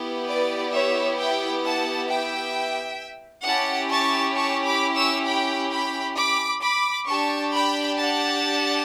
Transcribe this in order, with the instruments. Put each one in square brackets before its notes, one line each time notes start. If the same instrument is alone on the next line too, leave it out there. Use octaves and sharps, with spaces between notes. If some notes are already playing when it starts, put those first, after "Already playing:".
Already playing: [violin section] B3 E4 G4
B4 D5
C#5 E5
E5 G5
F#5 A5
E5 G5
C#4 E4 G4 F#5 A5
A5 C#6
A5 C#6
B5 D6
C#6 E6
G5 B5
G5 B5
B5 D6
B5 D6
D4 G4 A5 C#6
G5 B5
F#5 A5